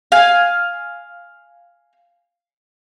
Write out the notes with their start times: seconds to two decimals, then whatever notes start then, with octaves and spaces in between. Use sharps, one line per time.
0.12 F5 G#5